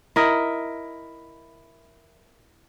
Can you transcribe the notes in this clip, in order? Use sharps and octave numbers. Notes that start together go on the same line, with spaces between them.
E4 A#4 D#5